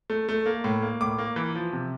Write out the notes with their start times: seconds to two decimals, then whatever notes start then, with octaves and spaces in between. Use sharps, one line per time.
0.10 A3
0.29 A3
0.46 A#3
0.64 A2
0.82 A#3
1.01 A2 D6
1.18 A#3
1.36 E3
1.55 F3
1.73 C3